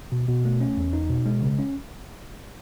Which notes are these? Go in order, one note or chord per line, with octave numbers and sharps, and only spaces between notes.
B2
B2
A3
C#4
E2
D#4
B2
G#3
C#3
C#4